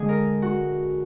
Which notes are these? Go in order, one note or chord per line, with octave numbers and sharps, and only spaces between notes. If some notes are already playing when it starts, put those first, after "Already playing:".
Already playing: D3 G#3 G#4
A#4
F#4